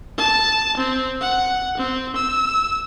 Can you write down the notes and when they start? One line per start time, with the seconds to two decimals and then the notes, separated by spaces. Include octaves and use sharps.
0.18 A5
0.77 C4
1.21 F#5
1.78 C4
2.16 E6